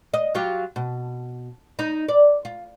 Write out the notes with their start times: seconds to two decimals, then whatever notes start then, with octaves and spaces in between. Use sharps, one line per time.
0.14 D#5
0.35 F#3 F4 G4
0.76 B2
1.79 D#4
2.08 D5
2.45 F4